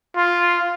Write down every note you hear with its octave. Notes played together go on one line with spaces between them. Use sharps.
F4